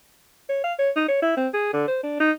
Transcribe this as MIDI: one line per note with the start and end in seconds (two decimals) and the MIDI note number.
0.49 0.63 73
0.64 0.73 77
0.78 0.90 73
0.96 1.04 63
1.08 1.19 73
1.22 1.34 64
1.37 1.48 60
1.53 1.71 68
1.73 1.84 50
1.88 2.00 72
2.03 2.16 62
2.20 2.31 63